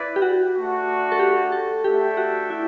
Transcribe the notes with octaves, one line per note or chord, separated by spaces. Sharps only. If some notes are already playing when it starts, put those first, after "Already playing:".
Already playing: E4 B4 D5
G4
F#4
A3 D4 F#4
A4
G4
A4
A3 D4 G4 A4 E5 G5
F#4
E4